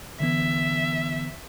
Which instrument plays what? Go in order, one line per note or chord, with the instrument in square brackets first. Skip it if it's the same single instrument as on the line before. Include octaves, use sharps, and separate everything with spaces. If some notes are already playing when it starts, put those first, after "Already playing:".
[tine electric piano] D3 E3 B3 [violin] E5